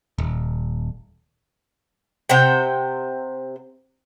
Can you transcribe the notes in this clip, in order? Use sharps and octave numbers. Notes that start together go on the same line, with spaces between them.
D#1
C3 C5 F#5 G5